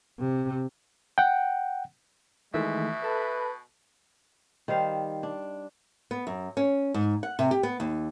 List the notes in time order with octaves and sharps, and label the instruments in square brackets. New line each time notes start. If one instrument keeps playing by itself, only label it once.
[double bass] C3
[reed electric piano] F#5 G5
[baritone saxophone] B2 [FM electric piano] D#3 E3 A3 [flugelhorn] G#3 [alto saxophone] E5
[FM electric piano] A4 A5 B5 [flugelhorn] B4
[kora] D#3 G3 C5 F5
D4
[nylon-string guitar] B3
F#2
C#4
G#2
F#5
C3
G4
B3
D#2